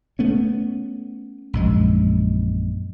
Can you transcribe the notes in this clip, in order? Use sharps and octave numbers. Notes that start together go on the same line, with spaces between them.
A3 B3 C#4
A#1 F#2 G#3